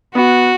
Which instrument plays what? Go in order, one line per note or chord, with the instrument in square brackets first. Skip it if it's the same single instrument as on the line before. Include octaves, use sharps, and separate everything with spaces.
[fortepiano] B3 [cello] F#4